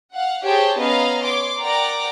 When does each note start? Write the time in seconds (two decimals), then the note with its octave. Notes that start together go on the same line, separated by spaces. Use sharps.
0.13 F5 F#5
0.45 G4 G#4 C5 C#5 G5 A5
0.79 B3 C#4 B4 D#5 F5 A#5
1.23 C#5 C6 D6
1.59 A#4 D5 F#5 G5 A#5 D6